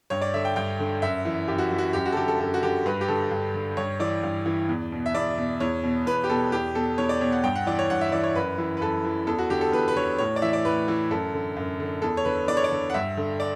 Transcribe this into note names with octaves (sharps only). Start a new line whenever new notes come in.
G2 C#5
D5
D3 E5
G5
G2 G5
D3
F#2 E5
E3
F#2 G4
F#4
E3
F#4
F#2 G4
F#4
A4
D3 G4
A4
F#2 A4
F#4
D3 G4
G2 B4
G4
D3 A4
G2
D3
G2 C#5
E3 D5
G2
E3
E2
B2
E5
E2 D5
B2
E2 C#5
B2
E2 B4
G4
B2 A4
E2 G4
B2 A4
E2 C#5
D5
B2 C#5
F#5
G2 G5
F#5
E3 D5
C#5
G2 F#5
E5
E3 D5
C#5
F#2 B4
E3
B4
F#2 A4
E3
E2 A4
F#4
D3 G4
A4
E2 B4
B4
D3 C#5
A2 C#5
D5
E3 E5
D5
A2 B4
E3
F#2 A4
D3
F#2
D3
E2 A4
C#5
D3 B4
E2 D5
C#5
D5
D3
F#5
G2 E5
D3
D5